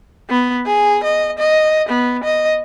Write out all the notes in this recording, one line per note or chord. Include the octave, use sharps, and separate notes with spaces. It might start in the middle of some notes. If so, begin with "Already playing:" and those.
B3
G#4
D#5
D#5
B3
D#5